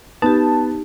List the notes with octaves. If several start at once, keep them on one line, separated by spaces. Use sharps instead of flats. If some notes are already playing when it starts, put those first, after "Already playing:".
B3 D#4 G4 A5